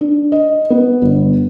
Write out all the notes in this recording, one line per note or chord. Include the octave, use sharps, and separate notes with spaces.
D4
D#5
B3
G1